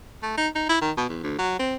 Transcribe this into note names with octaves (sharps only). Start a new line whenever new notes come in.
A3
D#4
D#4
E4
D#3
B2
E2
D2
F#3
C4